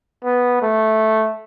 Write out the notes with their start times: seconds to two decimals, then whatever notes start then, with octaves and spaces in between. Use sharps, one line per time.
0.24 B3
0.62 A3